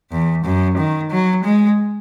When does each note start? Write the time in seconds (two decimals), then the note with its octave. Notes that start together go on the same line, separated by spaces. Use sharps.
0.12 E2
0.45 F#2
0.78 D#3
1.10 F#3
1.44 G#3